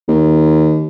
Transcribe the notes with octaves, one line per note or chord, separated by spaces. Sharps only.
D#2